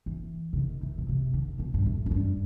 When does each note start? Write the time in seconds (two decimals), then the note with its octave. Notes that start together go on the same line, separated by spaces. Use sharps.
0.06 E3
0.53 C3
0.57 D#3
0.83 E3
0.98 B2
1.09 C3
1.34 D#3
1.59 B2
1.74 G2
1.86 A2
2.06 F#2
2.11 G2